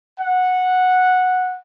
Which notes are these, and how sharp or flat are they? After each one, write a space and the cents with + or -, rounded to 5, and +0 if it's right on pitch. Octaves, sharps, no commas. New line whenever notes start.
F#5 -10